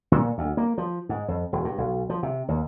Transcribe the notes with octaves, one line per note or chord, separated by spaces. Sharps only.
A#2
D2
A#3
F3
G#2
F2
E1
G2
B1
F3
C3
D#2